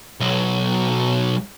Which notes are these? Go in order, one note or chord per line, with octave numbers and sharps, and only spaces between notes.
B1 F#3